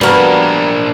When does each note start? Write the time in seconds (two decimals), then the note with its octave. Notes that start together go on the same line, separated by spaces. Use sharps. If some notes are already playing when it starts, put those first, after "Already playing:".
0.01 G3 A#3 B3 D4 F#4 A#4